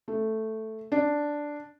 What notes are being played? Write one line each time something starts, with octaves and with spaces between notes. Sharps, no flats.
A3
D4